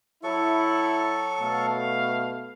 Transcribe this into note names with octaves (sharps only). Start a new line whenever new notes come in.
F#3 E4 A4 C#6
B2 A3 F5